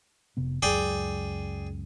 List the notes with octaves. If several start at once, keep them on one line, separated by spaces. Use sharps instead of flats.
F1 C3 B3
C#2 F#2 C#3 G#4 D5 G5